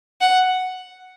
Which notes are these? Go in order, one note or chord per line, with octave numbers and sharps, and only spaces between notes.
F#5